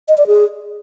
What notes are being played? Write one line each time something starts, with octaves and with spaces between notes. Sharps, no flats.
D#5
D5
G#4